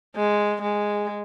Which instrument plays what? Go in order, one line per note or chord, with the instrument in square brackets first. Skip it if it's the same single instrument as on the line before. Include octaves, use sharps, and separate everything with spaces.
[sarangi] G#3
G#3